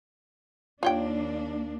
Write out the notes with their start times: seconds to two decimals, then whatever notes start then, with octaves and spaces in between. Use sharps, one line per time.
0.83 D#2 A#3 D4 F4 C#5 G5